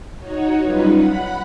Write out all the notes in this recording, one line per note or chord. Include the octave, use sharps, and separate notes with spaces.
D#4 F#4 C#5
F#3 G3 C#4 D#4 F4 B4
F#5 B5 F#6